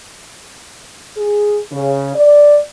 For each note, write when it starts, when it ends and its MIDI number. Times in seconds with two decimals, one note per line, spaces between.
1.18 1.61 68
1.72 2.14 49
2.16 2.59 74